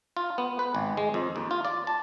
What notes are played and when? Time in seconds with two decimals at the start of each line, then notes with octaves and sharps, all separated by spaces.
0.17 F4
0.38 B3
0.59 B4
0.75 G#1
0.97 G#3
1.14 F2
1.36 D#2
1.51 F4
1.65 D5
1.87 A5